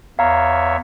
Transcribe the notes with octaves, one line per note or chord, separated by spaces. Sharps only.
E2 C#5 E5 F5 A#5